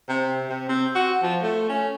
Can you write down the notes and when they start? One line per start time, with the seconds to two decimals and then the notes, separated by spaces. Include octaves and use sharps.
0.09 C3
0.49 C3
0.69 C4
0.95 F#4
1.23 F3
1.43 A3
1.69 C#4